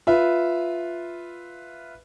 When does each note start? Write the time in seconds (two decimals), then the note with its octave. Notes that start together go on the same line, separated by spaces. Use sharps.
0.07 F4 B4 E5